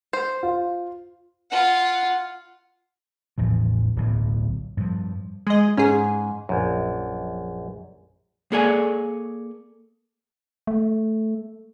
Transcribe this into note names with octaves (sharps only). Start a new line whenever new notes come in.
C5
F4
F4 F#5
A1 E2 F3
D1 B1 A2
G2 F3
G#3 G#4 D#5
G#2 C#4 G#4
A#1 F#2
A#3 G#4 A4 C#5 D5 G#5
A3